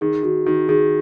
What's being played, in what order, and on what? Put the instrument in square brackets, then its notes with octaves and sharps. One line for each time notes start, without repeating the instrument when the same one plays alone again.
[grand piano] D#3 [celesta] G#4
[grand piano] D#3 [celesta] F#4
[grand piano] D#3 [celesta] F#4
[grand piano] D#3 [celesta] G#4